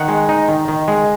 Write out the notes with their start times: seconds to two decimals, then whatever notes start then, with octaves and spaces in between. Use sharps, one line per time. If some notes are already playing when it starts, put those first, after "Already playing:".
Already playing: D#3 F#5
0.08 G#3
0.29 D#4
0.48 D#3
0.68 D#3
0.88 G#3